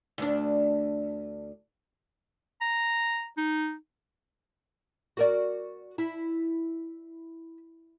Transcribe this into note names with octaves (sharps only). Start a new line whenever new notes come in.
D2 D4
A#5
D#4
F#4 A#4 D5
E4